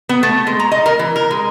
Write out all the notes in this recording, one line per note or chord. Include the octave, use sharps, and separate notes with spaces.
B3
A3
G#3
A#5
D#5
A#4
E3
A#4
G#3